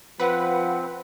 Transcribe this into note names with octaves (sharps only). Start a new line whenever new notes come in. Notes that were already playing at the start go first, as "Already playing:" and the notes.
F3 C4 B4 F#5